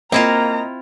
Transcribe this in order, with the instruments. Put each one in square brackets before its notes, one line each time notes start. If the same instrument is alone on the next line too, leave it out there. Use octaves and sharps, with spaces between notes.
[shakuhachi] A#3 [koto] C4 E4 F4 [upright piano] D#5 [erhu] A#5